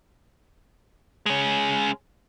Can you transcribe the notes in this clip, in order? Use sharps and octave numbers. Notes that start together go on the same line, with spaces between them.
G#3 C#4